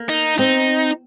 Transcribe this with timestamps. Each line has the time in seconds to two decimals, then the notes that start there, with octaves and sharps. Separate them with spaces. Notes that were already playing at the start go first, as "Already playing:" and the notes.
Already playing: A#3
0.09 D#4
0.38 C4 D#4